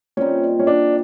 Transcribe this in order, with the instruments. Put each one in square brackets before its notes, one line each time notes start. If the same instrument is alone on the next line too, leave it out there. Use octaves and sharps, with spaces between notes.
[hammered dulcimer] A#2 G3 C4 D#4 [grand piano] C#4
[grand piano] C#4
D4